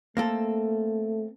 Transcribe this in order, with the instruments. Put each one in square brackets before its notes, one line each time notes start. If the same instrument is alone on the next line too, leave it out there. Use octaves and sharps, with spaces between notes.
[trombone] A3 [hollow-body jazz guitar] A#3 C4 A4